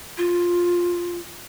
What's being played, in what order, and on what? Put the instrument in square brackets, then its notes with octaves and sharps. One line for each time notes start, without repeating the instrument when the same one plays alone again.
[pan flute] F4